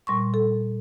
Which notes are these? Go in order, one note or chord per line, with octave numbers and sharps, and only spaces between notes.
A#2 G3 C6 C#6
A4